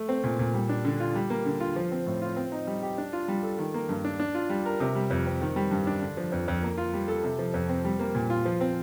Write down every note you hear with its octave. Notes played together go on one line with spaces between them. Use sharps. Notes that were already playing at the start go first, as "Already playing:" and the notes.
Already playing: A3
C4
A#2
A#2
G3
D4
D3
F4
G3
A#3
D3
F4
F3
C4
A2
F4
C4
D#4
G3
G4
D4
F4
G3
A4
D#3
A#3
G2
D4
D4
F4
G3
A#4
C3
G3
F2
C4
D#3
G3
G2
D4
D3
F3
F2
F2
A#3
F4
G3
A4
C3
F3
F2
C4
G3
A#3
A#2
F4
F3
C4